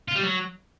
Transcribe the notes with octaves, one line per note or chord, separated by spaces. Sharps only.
F4
G3
F#3